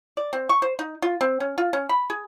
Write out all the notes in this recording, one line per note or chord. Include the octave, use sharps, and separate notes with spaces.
D5
C4
C#6
C5
D#4
F4
C4
C#4
F4
C#4
B5
G#4